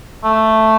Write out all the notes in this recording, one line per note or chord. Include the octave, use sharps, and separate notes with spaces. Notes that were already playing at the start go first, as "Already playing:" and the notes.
A3